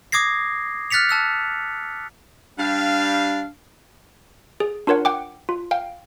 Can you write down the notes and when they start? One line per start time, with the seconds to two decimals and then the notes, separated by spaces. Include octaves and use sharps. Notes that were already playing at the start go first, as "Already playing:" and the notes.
0.12 D6 D#6 G#6 A#6 C7
0.91 F6 F#6 A6 B6 C#7 F7
1.09 A5 E6 F#6
2.59 G3 D4 F5
4.60 G#4
4.87 D4 F4 A#4 C#5 F#5
5.05 F#5 G5 D6
5.49 F4
5.71 F5 G5